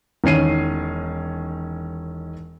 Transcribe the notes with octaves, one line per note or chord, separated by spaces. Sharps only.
E1 D#3 C#4 C7 D#7